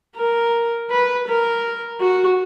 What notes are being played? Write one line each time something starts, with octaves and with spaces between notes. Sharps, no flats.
A#4
B4
A#4
F#4